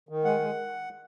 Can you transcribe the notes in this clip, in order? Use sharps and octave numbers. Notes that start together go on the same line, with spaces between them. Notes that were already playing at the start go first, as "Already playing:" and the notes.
D#3
G#3 F#5
G#3